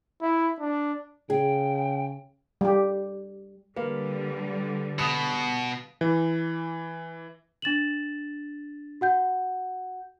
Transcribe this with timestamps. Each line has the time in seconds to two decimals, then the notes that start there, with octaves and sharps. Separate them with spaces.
0.22 E4
0.60 D4
1.30 C#3 G#4 G5
2.61 G3 G4
3.77 D3 G3 A#3 B4 F5
4.99 B2 D#6
6.01 E3
7.62 D4 A6 E7 F#7
9.01 F#4 F#5 G6